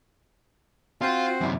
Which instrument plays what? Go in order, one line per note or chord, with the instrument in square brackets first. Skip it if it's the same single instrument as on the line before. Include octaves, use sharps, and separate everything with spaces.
[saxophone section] C4 F#4 C5 [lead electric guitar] F4
[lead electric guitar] F#2 C3